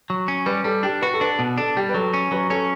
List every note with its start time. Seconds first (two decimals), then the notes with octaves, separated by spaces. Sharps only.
0.10 F#3
0.28 C#4
0.46 G3 B4
0.64 G3 A4
0.83 D4 G4
1.02 F#4 B4
1.14 A4
1.21 D4 B4
1.39 B2
1.58 D4 A4
1.77 G3 G4
1.89 B4
1.94 F#3 A4
2.14 C#4
2.31 F#3 B4
2.50 C#4 A4